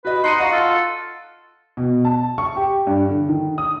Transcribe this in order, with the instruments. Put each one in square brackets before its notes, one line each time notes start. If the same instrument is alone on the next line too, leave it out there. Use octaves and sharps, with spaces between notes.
[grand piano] F#4 D#5 [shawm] B4
[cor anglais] D#4 [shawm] C6 [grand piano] F#6 C#7 D#7
[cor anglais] F#4 [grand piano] D#5 F5 [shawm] F#5
[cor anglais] F4 [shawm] A4
[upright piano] B2
A5
C#6
G4
G2
D3
D#3
D#6